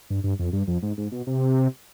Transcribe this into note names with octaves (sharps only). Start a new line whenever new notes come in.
G2
G2
F2
G2
F2
G#2
G#2
B2
C3